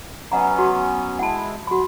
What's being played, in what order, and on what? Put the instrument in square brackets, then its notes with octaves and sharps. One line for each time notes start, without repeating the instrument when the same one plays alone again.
[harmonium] F#3 B3 C#4 [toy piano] D#5 F#5 A#5
[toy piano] F#4
[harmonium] G#3 E4 [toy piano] F#5 A5
[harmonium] F#3 [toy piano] F#4 B5